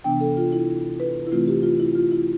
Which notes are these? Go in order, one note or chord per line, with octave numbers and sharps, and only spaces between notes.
C3 E3 B3 D4 G5
A4
F4
E4
B4
E4
C3 E3 A3 C4 F4
G4
F4
E4
F4
E4